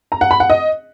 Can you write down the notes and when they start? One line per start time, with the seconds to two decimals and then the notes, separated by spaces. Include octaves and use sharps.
0.12 A#5
0.21 F#5
0.31 B5
0.40 F#5
0.50 D#5